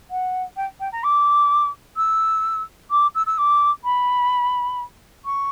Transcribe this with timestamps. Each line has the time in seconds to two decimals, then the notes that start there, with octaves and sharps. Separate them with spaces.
0.10 F#5
0.56 G5
0.80 G5
0.92 A#5
1.03 D6
1.96 E6
2.90 D6
3.15 E6
3.26 E6
3.38 D6
3.84 B5
5.25 C#6